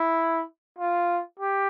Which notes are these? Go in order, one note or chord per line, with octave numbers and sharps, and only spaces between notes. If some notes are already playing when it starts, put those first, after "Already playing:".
Already playing: E4
F4
G4